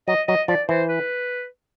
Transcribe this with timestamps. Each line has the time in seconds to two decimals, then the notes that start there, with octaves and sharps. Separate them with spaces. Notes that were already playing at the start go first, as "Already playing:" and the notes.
0.08 F#3 D#5
0.28 F#3 D#5
0.48 F3 D5
0.69 E3 C5
0.89 B4